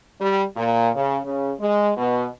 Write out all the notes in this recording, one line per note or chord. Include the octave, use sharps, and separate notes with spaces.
G3
A#2
C#3
C#3
G#3
B2